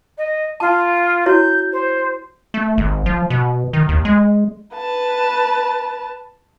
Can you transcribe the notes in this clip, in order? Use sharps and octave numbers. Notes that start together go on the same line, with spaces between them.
D#5
F4 A5
E4 F#4 C#5 G6
C5
A3
G#1
F3
B2
D#3
D#2
G#3
B4 A5